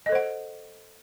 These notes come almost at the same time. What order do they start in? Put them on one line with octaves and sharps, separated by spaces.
D#5 A4 C5 F#5